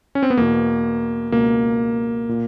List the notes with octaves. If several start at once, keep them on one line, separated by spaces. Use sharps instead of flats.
C#4
C4
B3
E2 B2 A#3
C#2 B2 A#3
A#2